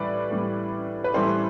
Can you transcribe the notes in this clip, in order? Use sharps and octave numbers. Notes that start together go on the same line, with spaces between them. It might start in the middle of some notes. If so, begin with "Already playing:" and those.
Already playing: A2 E3 G3 B4 D5
A2 E3 G3
B4
A2 E3 G3 A4 C5